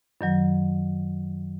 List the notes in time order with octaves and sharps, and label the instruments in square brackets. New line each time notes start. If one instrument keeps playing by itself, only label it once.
[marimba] F#2 D#3 F#3